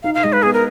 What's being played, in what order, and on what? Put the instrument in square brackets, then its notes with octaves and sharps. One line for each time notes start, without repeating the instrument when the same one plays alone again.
[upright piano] D#4 [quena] F5
[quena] F5
[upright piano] G#3 [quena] D#5
[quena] B4
[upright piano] B3 [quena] G#4
[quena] A#4